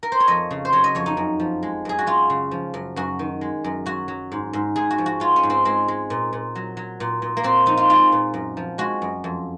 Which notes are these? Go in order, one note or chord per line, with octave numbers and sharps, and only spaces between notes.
A#4
C5
C#5
F2 D#5
C#3
C5
F#3 C#5
D#5
F2 C#5
D#4
F#2
F3
G#3
F#2 G#4
F#4
F#2 F4
C#3
F3
F#2
F#2 F#4
D#3
G#3
F#2
F#3 F#4
F#3
G#2
G#2
G#2 G#4
F#4
F3
F#4
G#3 F4
C#4
G#2
C4
G#3 C4
G#3
A#2
A#2
F#3
F#3
A#2
A#2
A#3
A#2 C4
F3 D#4
F4
G#3 F4
A#2
F#2
F3
G#3 F#4
F#2
F2